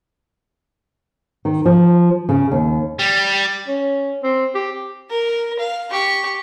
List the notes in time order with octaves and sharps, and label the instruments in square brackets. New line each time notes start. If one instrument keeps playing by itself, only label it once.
[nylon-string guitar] D#3
F3
C#3
D#2
[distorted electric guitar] G3
[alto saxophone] C#4
C4
G4
[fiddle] A#4
F5
G4 C#6